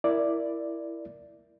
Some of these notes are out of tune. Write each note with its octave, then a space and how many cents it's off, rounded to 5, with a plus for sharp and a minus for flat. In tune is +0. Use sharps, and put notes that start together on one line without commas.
E4 +10 A#4 +5 D5 +0